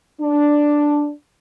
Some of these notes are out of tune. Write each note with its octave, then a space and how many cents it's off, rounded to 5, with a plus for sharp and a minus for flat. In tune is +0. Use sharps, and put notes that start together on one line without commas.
D4 +0